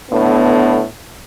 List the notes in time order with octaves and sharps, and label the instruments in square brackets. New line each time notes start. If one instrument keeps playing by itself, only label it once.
[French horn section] A2 D3 B3